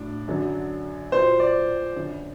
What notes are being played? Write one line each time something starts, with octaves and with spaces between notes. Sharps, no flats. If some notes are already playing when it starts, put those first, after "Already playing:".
Already playing: A2 F#3 D4
F#2 D3 F#3
A#2 F#3 C5
D5
F#2 D3 F#3